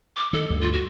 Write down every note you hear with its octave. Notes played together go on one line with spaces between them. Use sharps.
D6
D#3 A4
D2 G2
F4
F#4